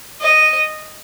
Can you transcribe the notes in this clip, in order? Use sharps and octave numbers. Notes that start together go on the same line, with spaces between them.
D#5